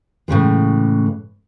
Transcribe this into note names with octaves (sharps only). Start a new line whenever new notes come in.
A2 C#3 E3 G#3